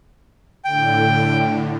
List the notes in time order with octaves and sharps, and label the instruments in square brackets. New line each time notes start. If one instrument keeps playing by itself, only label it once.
[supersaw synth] A2 D3 [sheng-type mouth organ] G5